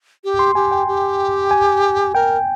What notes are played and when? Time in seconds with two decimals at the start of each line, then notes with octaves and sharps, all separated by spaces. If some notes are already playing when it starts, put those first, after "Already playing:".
0.24 G4
0.39 C6
0.55 G4 G#5
0.72 G5
0.87 G4
1.51 G#5
2.15 A#4 G5